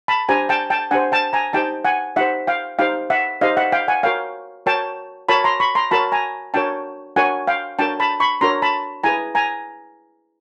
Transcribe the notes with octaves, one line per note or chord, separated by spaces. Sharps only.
A5 B5
D4 G4 C5 G#5 A#5
G5 A5
G5 A5
D4 G4 C5 F#5 G#5
G5 A5
G#5 A#5
D#4 G4 C5 G5 A5
F#5 G#5
D#4 G4 C5 E5 F#5
F5 G5
D#4 G4 C5 F5 G5
E5 F#5
D#4 G4 C5 D#5 F5
E5 F#5
F5 G5
F#5 G#5
F#4 A#4 C#5 F5 G5
F#4 A#4 C#5 G5 A5
F#4 A#4 C#5 A5 B5
A#5 C6
B5 C#6
A#5 C6
F#4 A#4 C#5 A5 B5
G#5 A#5
D4 F#4 A#4 C#5 G5 A5
D4 F#4 A#4 C#5 F#5 G#5
F5 G5
D4 F#4 A#4 C#5 G5 A5
A5 B5
B5 C#6
D4 F#4 A#4 C#5 A#5 C6
A5 B5
E4 G#4 B4 G#5 A#5
G#5 A#5